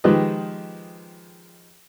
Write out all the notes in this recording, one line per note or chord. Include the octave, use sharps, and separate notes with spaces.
D#3 F3 G#3 G4 B4 D#5